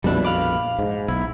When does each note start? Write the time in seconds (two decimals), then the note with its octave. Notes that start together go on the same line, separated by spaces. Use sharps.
0.04 A#1 F2 B2 G3 D4 E4
0.25 F5 B5 D6
0.79 G#2
1.08 B1 E4